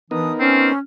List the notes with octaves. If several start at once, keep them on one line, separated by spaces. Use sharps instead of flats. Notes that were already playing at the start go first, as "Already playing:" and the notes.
E3 B3 D4 D#4 A#4 D#6
C4 C#4